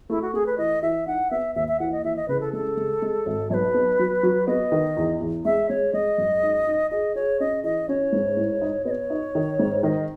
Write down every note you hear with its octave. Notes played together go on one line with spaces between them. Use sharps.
A3 E4
F#4
A3 G#4
B4
E3 D#5
E3 E5
D#4 F#5
B3 E5
D#2 E5
E5
E3 F#5
D#5
E3 E5
D#5
C#3 B4
A4
G#3 A4
G#3
G#3
G#1
B1 B4 C#5
B3
F#3
F#3
B3 D#5
D#3
E2
E2
G#3 E5
G#3 C#5
G#3 D#5
F#2
D#4
D#4
G#4 D#5
G#4 C#5
C#4 D#5
E3 D#5
C#4 C#5
G#2
A2
D#4
B3 D#5
C#5
D#4
D#3
G#2
D#3 D#5